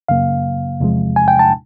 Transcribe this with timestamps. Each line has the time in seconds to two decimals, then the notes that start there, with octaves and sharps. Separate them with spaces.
0.08 F#2 C#3 F#3 A#3 F5
0.80 E2 C3 F3 G#3
1.16 G#5
1.28 G5
1.39 A5